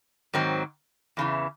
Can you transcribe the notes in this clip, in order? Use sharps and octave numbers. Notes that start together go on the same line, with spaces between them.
G#2 D#3 F#3 C4
E2 C#3 E3